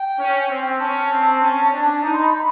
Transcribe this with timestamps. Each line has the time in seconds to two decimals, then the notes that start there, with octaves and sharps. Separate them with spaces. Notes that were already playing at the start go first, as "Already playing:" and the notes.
Already playing: G5
0.19 C#4
0.50 C4
0.80 C#4 A5
1.11 C4
1.41 C#4
1.72 D4
1.97 A5
2.03 D#4 A#5
2.14 C6
2.23 B5